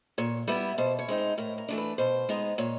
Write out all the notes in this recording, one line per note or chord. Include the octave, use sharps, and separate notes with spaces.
A#2 C#5
G3 B3 E4 B4
B2 C5
C#5
G#3 C4 D#4
C5
A2 A#4
A#4
E3 A3 D4
B4
B2 C5
G#3 B3 D#4
A#2 C#5